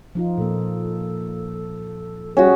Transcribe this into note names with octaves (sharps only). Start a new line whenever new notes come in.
F3 D#4 F4
A#2 A#3 A4
G3 C#4 F#4 G#4